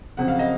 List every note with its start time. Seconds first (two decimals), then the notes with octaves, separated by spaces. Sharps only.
0.17 F2 C#3 F#3 C4 F#5
0.28 F5
0.39 D#5